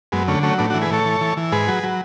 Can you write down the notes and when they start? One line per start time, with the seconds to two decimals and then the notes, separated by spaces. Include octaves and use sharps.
0.12 F#2 G#3 B3
0.28 D3 A3 C#4
0.43 F#3 A3 C#4
0.58 A2 B3 D4
0.70 D4 F#4
0.74 E3
0.82 G#4 B4
0.90 A2 A4 C#5
1.06 E3
1.21 E3
1.37 E3
1.52 G#2 G#4 B4
1.67 F#3
1.83 F#3